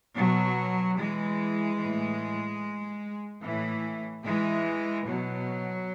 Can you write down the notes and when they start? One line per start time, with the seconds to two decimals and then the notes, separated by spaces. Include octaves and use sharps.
0.16 B2 F#3
0.98 E3 G#3
1.79 A2 E3
3.42 A2 E3
4.24 E3 G#3
5.06 B2 F#3